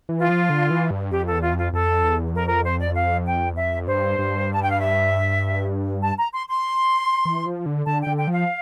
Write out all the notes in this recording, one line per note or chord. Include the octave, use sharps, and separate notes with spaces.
E3
F4
F3
D3
E3
G2
F2 G4
A4
E2
F4
F2
F4
F2 A4
E2
F2 A#4
A#4
C5
D5
F5
G5
E2
F2 E5
G2 C5
G2
A5
G5
F5
E5
A5
A#5
C6
C6
E3
F3
D3
D3 A5
D3 G5
G5
F3
F5